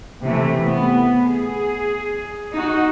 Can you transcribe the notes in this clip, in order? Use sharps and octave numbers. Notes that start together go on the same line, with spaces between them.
C3 E3 A3
B3
G#4
D#4 F#4